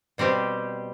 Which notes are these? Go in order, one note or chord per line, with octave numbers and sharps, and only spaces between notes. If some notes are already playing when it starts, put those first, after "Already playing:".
B2 G3 C4 G4